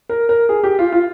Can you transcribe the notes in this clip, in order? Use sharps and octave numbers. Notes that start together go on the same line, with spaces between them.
A#4
A#4
G#4
G4
F4
F4